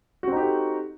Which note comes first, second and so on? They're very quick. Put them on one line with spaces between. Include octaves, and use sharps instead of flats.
F#4 C4 D#4 G4 A4